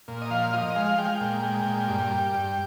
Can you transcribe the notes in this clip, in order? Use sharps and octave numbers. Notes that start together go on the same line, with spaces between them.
A#2
D#5
F3 F5
F3 D#5
G#3 F5
G#3 G5
F5
G5
A#2
G#3
A#2
G2
G3
G2